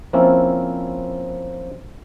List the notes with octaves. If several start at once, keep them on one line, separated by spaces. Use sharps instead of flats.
F3 A#3 C4 C#4 E4 F4